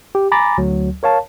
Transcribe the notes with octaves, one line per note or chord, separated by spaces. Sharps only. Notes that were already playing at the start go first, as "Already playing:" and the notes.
G4
G#5 A#5 B5 D6 A6 A#6
D2 F#3
A#4 C#5 F5 A5